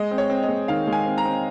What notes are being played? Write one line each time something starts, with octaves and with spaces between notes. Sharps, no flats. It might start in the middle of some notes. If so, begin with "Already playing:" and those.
Already playing: G#3 D#5
C4
C#5
C4
D#5
G#3
D#3 F5
G#3
G#5
C4
A#5
C4